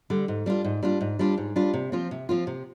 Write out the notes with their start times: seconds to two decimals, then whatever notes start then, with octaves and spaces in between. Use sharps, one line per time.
0.10 D3 G3
0.28 G#2
0.46 G3 D4 F4
0.64 G#2
0.83 G3 D4 F4
1.01 G#2
1.19 G3 D4 F4
1.38 G#2
1.56 G3 D4 F4
1.73 C3
1.92 F3 C4 F4
2.11 C3
2.29 F3 C4 F4
2.47 C3